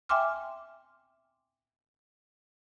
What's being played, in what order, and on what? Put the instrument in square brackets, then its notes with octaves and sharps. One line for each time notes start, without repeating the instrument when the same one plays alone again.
[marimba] E5 G5 G#5 C6 D6 F6